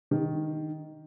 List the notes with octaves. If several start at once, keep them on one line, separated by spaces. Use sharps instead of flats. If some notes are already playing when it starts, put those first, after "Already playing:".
D#3